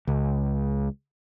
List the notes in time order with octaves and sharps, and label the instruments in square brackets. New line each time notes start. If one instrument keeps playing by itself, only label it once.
[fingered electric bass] C#2